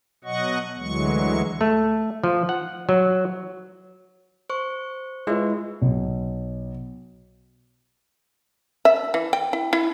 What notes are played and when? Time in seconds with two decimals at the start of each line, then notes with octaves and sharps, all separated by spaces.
0.24 B2 F#3 D#5 F#5 C#6
0.78 D2 E3 F#3 G#3 C#6
1.61 A3
2.23 F3
2.49 F#5
2.89 F#3
4.50 C5 C#6
5.27 G#3 E4 F4 B4 C#5
5.82 B1
8.85 E5
9.14 E3
9.33 G5
9.53 E4
9.73 E4